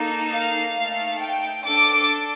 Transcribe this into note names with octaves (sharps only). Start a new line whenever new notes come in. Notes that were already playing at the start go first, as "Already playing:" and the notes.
Already playing: A#3 D#4 A4
F5
A3 D#4 A4
G5
D4 A4 D6